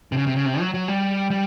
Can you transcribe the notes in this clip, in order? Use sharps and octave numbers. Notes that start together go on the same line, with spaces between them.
C3
C#3
C3
C#3
C3
F#3
F#3
G3
G3